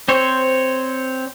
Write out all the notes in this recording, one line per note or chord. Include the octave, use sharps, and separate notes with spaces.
C4 C5 C#5